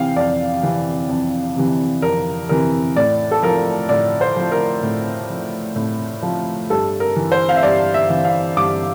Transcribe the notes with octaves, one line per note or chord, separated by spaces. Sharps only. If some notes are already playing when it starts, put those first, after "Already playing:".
Already playing: C3 E3 F5 G5
F2 D5
C3 E3
F2
C3 E3
F2 A#4
C3 E3 A#4
A2 D5
A4
F3 A#4
A2 D5
C5
F3
A#4
A2
F3
A2
F3
G2 A4
A#4
E3
C5
F5
E5
G2 D5
E5
E3
F5
G2 D6